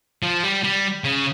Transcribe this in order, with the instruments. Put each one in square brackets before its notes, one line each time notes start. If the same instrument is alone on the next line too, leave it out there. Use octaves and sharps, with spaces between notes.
[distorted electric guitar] F3
G3
G3
C#3